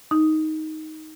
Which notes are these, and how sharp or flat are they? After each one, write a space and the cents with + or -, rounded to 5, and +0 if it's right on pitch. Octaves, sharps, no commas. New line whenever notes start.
D#4 +10